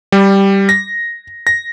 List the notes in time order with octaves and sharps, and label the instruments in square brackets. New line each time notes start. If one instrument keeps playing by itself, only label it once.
[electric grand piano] G3
A#6
A#6